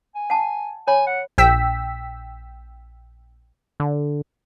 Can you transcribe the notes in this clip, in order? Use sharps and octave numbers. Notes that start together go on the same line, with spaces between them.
G#5
F#5 A5
C#5 G#5 B5
F#5
A#1 G5 E6 B6
D3